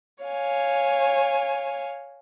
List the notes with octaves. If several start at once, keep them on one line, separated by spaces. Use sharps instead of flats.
C#5 F5 G#5